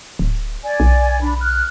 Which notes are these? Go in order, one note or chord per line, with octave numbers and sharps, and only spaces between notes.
D1
D5 G#5
B1
D4 B5
F6 F#6